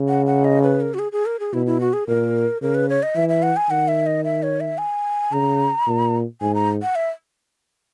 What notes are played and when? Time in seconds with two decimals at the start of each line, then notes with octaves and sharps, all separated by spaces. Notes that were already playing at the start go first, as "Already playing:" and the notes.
Already playing: C#3
0.09 F#5
0.26 F#5
0.45 D#5
0.62 B4
0.81 A#4
0.94 F#4
0.99 G#4
1.12 G#4
1.26 A#4
1.40 G#4
1.53 B2 E4
1.66 E4
1.80 F#4
1.93 G#4
2.07 A#2 A#4
2.62 C#3 A#4
2.75 B4
2.89 C#5
3.03 D#5
3.15 E3 E5
3.29 E5
3.43 F#5
3.57 G#5
3.70 D#3 F#5
3.88 E5
4.06 D#5
4.24 E5
4.43 C#5
4.60 E5
4.78 G#5
5.32 C#3 A#5
5.87 A#2
6.41 G#2 G#5
6.55 A#5
6.82 F#5
6.95 E5